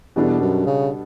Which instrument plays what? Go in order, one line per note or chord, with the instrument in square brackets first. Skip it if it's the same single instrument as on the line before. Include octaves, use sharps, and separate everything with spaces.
[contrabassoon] E2 [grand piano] B2 G3 B3 D4 A4
[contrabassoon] F#2
C#3